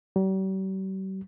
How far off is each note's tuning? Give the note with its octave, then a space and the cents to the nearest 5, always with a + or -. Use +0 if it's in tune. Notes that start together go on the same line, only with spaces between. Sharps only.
G3 -45